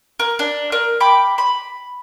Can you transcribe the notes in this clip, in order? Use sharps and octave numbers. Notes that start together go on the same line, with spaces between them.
A#4
D4
A#4
G5 B5 D6
B5